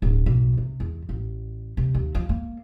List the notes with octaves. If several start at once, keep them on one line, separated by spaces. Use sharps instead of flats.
D1
B1
C3
E2
A1
C3
D#2
F3
A#3